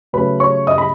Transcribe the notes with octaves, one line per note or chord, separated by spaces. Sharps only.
C#3 F#3 A3 C#4 B4 B5
C#5 C#6
D#5 D#6
B5